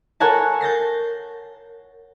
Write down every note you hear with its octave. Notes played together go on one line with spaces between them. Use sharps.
A4 A#4 C#5 F#5 G#5 A5
G6 A6 A#6 C7